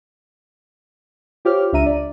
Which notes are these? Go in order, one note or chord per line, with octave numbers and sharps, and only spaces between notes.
F4 G4 C5 C#5 D6 F6
C#2 D4 E5 A#5 D#7
D5